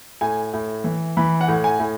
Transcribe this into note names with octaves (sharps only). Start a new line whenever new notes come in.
A2 G#5
A2
E3
E3 B5
F#5
A2
G#5
A2